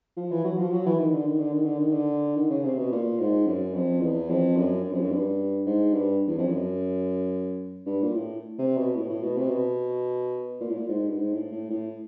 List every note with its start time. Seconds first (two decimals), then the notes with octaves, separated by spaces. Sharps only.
0.17 F3
0.31 E3
0.44 F#3
0.59 F3
0.73 F#3
0.86 E3
0.99 D#3
1.13 D3
1.26 D#3
1.40 D3
1.53 D#3
1.65 D3
1.79 D#3
1.92 D3
2.37 D#3
2.50 C#3
2.64 C3
2.78 B2
2.92 A#2
3.19 G#2
3.47 F#2
3.74 F2
4.01 E2
4.30 F2
4.57 F#2
4.84 F#2
4.92 F2
5.00 F#2
5.11 G2
5.66 G#2
5.93 G2
6.28 E2
6.38 F2
6.48 F#2
7.86 G2
8.03 A#2
8.13 A2
8.59 C3
8.78 B2
8.96 A2
9.09 A2
9.23 B2
9.37 C3
9.50 B2
10.61 A#2
10.69 A2
10.77 A#2
10.89 G#2
11.08 G2
11.15 G#2
11.34 A2
11.52 A2
11.70 A2